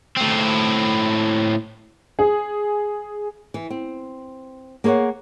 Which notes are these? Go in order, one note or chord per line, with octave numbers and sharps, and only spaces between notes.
A2 C4
G#4
E3
C4
A#3 G#4 C5 C#5 F#5